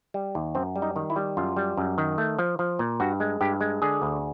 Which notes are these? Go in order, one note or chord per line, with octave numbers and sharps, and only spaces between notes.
G3
D#2
F#2 C4
G3
D#4
D#3
E4
G3
F#2 F4
G3
F#2
D#3
A3
F3
F3
A#2
G2 F#4
G#3
G2 G4
G#3
D3 G#4
D2